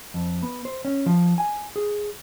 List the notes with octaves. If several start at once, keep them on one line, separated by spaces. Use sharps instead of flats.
F2
B3
C5
C#4
F3
G#5
G#4